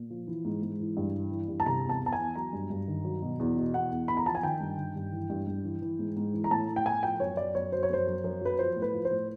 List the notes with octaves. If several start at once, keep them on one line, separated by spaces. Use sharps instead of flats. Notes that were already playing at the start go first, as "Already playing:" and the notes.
Already playing: A#2
F3
E3
G#2
G#2
E3
G2
E3
E3
G2
A5
C3 A#5
E2
A5
E2
A5
G#5
E2
F#3 A#5
G2
G2
D#3
F#3
B2
E2
B2
E2 F#5
E2
E2 B5
A#5
F3 A5
G#5
D#3 G5
G2
D#3
G2
E3
G2
G2
E3
E3
G#2
G#2
E3
A#5
A2 A5
A2
G5
A2 G#5
F3 G5
F#2 C#5
F#3 D5
F#2 C#5
F#3 C5
C#5
F#2 C5
F#2
F#2
F#3 B4
F3 C5
A2
B4
F3
C5
A2